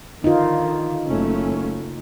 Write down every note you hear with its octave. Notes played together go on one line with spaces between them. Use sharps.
D3 D#3 D#4 F4
F#1 A3 C#4